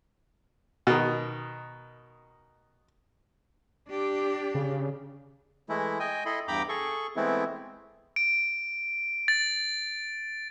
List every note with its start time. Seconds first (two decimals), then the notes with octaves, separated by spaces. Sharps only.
0.87 B2 D#3
3.89 D4 G4
4.55 C#3
5.69 E3 G#3 A3 E4
6.00 D#5 G5 G#5
6.26 E4 A4 D#5 B5 C6
6.48 E2 G2 G5 A#5 B5 D6
6.69 G#4 A4 C#6
7.16 E3 G#3 A3 B3 C4 E4
8.16 D7
9.28 A6